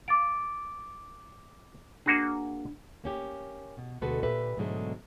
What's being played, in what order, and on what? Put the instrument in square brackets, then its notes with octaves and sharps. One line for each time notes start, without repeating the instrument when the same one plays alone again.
[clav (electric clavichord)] F5 [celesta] D6 A6 D7
[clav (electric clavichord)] A#3 F#4 G#4 [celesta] D4
[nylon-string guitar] A#3 C#4 G4
B2
D2 B2 G#3 F#4 A4 B4
A#2 G4 B4 E5
G#2 B2 D3 F#3 G#3 A3